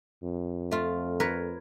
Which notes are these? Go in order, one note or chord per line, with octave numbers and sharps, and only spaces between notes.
F2
A3 F4
A#4 B4 C#5